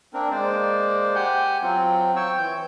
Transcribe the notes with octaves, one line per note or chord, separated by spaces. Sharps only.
A#3 C4 D4 A#4
G#3 A#3 C5 D5
G4 F#5 G#5 G6
F#3 C4 F4
C#5 G5 C#6 E6
E3 G6